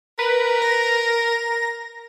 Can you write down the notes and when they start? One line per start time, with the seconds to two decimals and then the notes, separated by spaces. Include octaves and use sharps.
0.19 A#4 B4
0.62 A#6